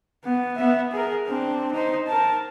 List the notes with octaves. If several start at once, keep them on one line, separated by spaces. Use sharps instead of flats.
B3
B3 E5
G#4 A#4
C4 D4
D#4 C5
A#4 A5